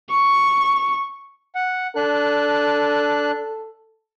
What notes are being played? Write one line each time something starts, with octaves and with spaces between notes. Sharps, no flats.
C#6
F#5
D4 A4 F#6